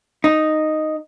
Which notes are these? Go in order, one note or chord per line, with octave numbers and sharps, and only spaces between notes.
D#4